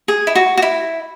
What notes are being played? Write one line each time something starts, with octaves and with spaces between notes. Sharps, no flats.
G#4
E4
F#4
F#4
E4